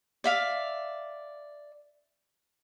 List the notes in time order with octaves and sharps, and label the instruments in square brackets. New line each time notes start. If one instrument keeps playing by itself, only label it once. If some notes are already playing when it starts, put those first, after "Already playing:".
[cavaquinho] D5 E5 F5